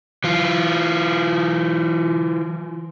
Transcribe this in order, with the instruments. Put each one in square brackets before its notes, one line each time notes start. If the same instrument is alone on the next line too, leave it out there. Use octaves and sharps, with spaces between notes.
[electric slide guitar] E3 F4